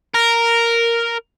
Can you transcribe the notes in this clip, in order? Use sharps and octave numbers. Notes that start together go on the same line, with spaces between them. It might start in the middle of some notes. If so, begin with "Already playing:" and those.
A#4